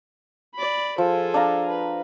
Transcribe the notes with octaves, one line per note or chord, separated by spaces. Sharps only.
D5 B5
F3 G#4 A4
D4 F5 A#5
B4